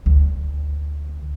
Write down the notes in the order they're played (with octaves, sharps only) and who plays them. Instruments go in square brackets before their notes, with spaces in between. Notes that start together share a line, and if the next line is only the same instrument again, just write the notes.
[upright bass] D2